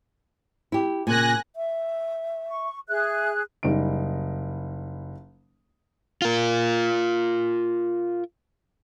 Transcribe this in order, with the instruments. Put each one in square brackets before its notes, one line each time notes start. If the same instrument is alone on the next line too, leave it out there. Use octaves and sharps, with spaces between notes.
[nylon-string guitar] E4 G4
[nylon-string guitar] A#2 C#3 [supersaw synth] G#5 F#6 A#6
[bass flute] E5
[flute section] C#6
[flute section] G#4 F#6 [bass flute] E5
[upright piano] F#1 G3 D#4 D7
[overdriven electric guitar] F4 A#4